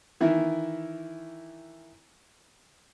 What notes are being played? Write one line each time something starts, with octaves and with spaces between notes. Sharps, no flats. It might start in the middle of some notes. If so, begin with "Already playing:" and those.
D#3 E3 E4